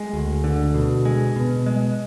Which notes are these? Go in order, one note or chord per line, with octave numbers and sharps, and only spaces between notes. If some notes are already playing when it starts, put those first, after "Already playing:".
Already playing: G#3
D2
D3
B2
G#3
B2
G#3